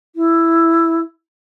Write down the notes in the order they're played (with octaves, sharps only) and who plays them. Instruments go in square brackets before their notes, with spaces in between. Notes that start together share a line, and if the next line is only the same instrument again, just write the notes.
[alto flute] E4